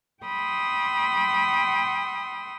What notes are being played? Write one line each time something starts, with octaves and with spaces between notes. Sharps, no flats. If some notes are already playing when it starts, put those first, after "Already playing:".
G5 B5 C6 D#6 E6